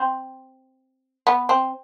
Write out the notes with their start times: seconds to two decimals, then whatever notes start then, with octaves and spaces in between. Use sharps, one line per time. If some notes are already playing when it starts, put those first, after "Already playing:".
Already playing: C4
1.27 B3
1.49 C4